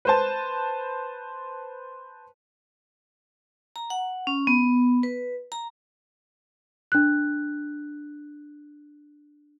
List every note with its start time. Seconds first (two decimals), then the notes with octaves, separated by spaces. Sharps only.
0.05 B4 C5 A5
3.76 A#5
3.90 F#5
4.27 C#4
4.47 B3
5.03 B4
5.52 A#5
6.92 D4 F#6